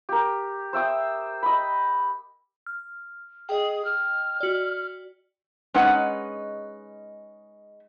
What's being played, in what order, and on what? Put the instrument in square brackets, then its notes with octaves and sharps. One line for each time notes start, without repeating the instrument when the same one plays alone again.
[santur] G4 A#4
C5 E5 G5 D#6
D#5 B5
[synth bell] F6
[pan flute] G#4 [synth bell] D#5 G5
[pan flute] F6
[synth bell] F#4 D5
[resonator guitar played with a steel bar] G#3 C#4 D#4 B4 F#5